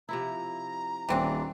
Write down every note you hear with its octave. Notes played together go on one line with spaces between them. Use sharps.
C3 F3 E4 A#5
D#1 E3 C4 D4